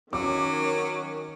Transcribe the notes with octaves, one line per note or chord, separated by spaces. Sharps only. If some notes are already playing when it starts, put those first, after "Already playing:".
D#3 F#3 C#4 D6